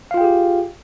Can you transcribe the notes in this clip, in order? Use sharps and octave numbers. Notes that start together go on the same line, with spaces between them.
F4 G4 G#4 F5 G5